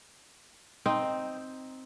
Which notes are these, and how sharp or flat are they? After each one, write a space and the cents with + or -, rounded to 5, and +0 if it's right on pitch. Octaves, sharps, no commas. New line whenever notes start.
C4 +0 D#4 +0